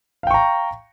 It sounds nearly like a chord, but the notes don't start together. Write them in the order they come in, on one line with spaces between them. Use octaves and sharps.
F5 G5 C#6 A#5